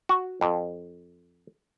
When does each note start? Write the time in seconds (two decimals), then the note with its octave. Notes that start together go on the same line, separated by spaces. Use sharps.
0.09 F#4
0.41 F2